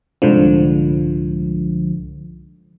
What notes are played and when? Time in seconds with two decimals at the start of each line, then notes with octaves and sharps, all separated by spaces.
0.22 C2 G#2 D3 F3